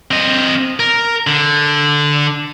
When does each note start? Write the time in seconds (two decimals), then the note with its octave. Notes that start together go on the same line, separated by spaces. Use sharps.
0.11 C4 D#5
0.80 A#4
1.27 D3